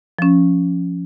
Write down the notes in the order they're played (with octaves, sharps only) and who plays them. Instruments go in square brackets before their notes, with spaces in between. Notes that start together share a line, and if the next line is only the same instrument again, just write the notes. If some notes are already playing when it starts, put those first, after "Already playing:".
[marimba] F3 C#4